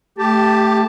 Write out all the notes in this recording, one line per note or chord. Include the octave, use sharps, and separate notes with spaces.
A3 G4 A5